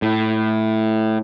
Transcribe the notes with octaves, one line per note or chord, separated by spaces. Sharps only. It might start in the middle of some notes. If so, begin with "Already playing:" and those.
A2